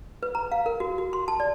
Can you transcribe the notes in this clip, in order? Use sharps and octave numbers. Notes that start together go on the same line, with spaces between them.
B4
A#5
F5
A#4
F#4
F#4
C6
A5
D5